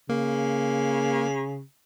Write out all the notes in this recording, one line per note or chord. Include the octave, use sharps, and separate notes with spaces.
C#3 A#3